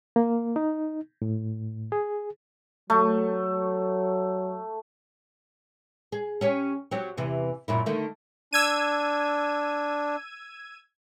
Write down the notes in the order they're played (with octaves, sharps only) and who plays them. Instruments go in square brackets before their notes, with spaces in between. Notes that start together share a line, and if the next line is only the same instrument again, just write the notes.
[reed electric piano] A#3
D#4
A2
G#4
[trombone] F#3 [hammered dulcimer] A3
[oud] G#4
C#4 G4 C#5
F#3 C4 G4
E2 C3 E3
F#2 A#2 E4
D3 D#3 A3
[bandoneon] D4 [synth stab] E6 G#6 D#7